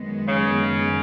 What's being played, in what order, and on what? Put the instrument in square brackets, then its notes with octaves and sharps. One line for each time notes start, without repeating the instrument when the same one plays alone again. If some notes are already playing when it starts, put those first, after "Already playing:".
Already playing: [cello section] F#2 D#3 G#3 B3
[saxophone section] C#3